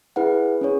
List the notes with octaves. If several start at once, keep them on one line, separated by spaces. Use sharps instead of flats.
E4 G#4 B4 F#5
C#4 G#4 C#5